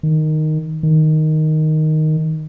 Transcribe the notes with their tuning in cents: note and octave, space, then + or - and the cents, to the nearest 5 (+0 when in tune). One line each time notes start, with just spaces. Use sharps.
D#3 -5
D#3 +0